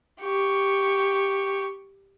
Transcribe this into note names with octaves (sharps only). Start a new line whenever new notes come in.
G4 C#6